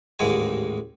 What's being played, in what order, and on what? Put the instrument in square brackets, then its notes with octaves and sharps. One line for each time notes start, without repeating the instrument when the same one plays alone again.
[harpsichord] A1 D#2 G#2 G#3 G#5